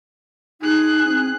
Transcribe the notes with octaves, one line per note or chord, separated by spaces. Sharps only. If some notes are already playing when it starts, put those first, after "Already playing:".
D#4 G#4 F#6
C4